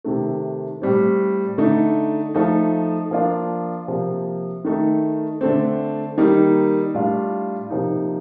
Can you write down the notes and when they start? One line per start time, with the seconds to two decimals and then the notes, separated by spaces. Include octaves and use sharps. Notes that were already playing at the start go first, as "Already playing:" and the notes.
0.05 C3 D#3 A3
0.82 A2 G3 C4
1.58 D3 A3 D#4
2.35 F3 A3 D#4
3.11 F3 A#3 D4 F4
3.88 C3 F3 A#3
4.65 D#3 A3 D#4
5.41 D3 A3 C4
6.18 D#3 G3 A#3 D#4
6.94 A2 G3 D4 F4
7.70 C3 F3 A#3 D#4